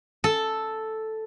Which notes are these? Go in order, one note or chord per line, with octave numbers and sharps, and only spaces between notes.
A4